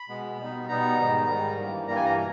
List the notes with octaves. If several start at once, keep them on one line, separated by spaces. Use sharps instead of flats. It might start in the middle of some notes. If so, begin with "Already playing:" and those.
Already playing: B5
B2 G#3 B3
B2 G3 B3 D#4
B2 G3 B3 D#4 A#5
G#2 D#3 G3
G#2 D#3 G3
G2 E3 G3 A#3
G2 E3 G3 A#3 A#5
G#5
A#5
B2